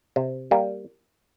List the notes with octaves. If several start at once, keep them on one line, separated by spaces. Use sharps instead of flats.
C3
G3 A#3